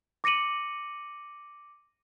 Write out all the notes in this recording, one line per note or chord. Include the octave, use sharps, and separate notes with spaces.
D6 A#6 C#7 D#7 F#7